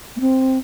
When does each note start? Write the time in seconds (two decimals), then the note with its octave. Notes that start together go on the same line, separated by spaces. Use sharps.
0.17 A#3
0.21 C4